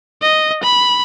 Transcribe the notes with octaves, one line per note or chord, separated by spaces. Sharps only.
D#5
B5